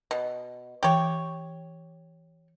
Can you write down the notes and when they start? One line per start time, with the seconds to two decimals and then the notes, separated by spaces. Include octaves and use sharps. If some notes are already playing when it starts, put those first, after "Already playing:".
0.11 B2
0.83 E3 G4 C#5 G5